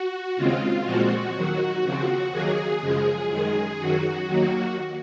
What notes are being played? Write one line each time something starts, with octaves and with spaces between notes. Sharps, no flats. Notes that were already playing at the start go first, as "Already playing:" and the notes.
Already playing: F#4
D#2 C#3 G#3 C4 F4
A#2 F3 G#3 C4 F#4
D#2 D#3 F#3
D#2 C#3 F3 C4
D#2 D#3 F#3 A#3 G#4
F#2 C#3 F3 G#3
F#2 D#3 G#3 G#4
F#2 D#3 F#3 F#4
D#2 D#3 F#3 A#3